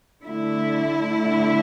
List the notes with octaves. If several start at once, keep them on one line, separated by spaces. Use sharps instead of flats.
D3 A3 E4